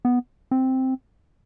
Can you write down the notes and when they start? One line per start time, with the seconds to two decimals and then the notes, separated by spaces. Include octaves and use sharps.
0.05 B3
0.51 C4